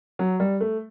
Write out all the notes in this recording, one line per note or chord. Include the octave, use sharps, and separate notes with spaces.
F#3
G3
A3